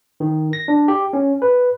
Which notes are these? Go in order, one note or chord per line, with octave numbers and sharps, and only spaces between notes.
D#3
A#6
D4
G4
C#4
B4